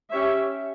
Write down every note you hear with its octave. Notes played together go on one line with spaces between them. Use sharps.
C#4 G4 C#5 E5